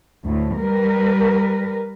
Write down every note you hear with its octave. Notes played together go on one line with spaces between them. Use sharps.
D2 A2
G3 A#4 B4